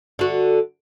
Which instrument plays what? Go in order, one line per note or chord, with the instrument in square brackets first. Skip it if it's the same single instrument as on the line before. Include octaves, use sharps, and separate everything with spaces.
[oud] D3 F#4